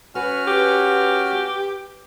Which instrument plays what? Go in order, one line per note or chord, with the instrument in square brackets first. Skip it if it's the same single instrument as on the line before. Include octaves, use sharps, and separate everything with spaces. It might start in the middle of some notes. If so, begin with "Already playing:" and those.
[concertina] C#4 F#4 F6 [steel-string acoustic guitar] B4
[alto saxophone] G4